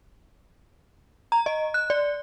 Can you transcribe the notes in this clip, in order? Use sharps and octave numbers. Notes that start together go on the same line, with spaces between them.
A#5
D#5
F#6
D5